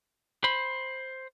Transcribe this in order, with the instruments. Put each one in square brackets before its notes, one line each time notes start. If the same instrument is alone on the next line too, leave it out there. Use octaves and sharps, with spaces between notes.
[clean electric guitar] C5 B5